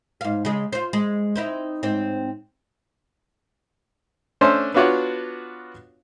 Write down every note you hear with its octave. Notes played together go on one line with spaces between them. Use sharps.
G#2 F5
C#3 G#3
F4 C5
G#3
C4 D#4 E4
G#2 C4
A3 C#4 D4 C5 C#5 C6
B3 D4 F4 F#4 C#5 D5